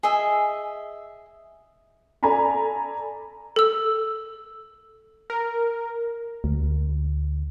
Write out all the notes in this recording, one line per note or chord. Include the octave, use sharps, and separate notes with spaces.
G#4 D#5 E5
A4 D5 G#5 A#5 B5
A4 E6
A#4
D2